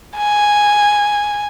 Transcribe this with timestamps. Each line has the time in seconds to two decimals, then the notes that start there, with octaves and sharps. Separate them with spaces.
0.17 G#5